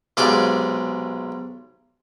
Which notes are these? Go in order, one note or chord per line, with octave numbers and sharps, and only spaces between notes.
B1 C3 G#3 D5 F5 D6